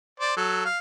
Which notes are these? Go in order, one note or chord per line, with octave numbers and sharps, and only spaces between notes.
C5 D5
F#3 A4
F5